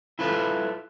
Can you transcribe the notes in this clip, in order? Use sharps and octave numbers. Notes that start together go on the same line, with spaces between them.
E4 F4 A4 B4